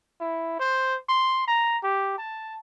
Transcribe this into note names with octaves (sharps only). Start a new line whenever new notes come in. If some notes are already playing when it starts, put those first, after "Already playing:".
E4
C5
C6
A#5
G4
A5